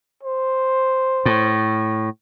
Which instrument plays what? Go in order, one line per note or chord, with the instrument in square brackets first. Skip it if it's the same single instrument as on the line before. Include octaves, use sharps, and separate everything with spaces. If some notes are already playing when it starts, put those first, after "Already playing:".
[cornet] C5
[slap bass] A2